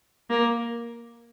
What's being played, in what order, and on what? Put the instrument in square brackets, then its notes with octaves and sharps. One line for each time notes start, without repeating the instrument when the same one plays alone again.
[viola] A#3